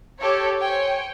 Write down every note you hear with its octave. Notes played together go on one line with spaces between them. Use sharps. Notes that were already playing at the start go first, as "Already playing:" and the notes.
G4 A4 C#5
C5 C#5 G5 G#5